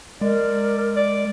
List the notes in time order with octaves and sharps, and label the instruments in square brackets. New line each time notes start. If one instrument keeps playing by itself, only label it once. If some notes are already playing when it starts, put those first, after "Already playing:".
[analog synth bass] G#3 [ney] A#4 [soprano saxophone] D5
[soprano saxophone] D5